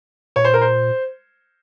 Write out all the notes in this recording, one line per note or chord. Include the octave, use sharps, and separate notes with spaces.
A#2 C#5
C5
A#4
C5